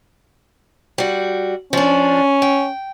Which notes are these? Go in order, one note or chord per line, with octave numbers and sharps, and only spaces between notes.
G3 F#4
F3 C#4 D4
G5